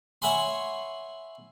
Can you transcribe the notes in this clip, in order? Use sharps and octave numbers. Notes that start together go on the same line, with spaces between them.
C#5 E5 F#5 G#5 B5 C6